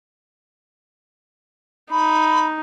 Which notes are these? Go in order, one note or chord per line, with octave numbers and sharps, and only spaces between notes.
D#4 B5